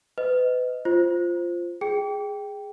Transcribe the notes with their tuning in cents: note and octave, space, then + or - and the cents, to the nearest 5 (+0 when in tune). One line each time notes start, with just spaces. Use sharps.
B4 +35 D#5 +0
F4 -5 C5 +0
G#4 -5 G5 +0